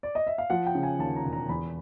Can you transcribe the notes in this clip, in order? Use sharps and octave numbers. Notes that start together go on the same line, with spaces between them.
D5
D#5
E5
F5
F3 F#5
G5
C#3
G#5
D#2 A5
A#5
E1
A#5
E2 B5